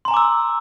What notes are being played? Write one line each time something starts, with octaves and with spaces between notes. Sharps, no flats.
G#5 A#5 C6 D6 E6